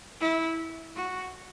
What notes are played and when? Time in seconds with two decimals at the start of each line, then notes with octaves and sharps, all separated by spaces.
0.21 E4
0.96 F#4